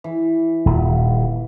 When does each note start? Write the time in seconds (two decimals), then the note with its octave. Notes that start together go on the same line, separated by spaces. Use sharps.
0.04 E3
0.66 D#1